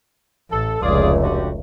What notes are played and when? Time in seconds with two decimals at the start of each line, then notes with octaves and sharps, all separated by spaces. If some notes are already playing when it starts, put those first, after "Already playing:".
0.51 A1 A4
0.82 F1 C#2 F4 G#4 D5
1.23 D3 F#4 G4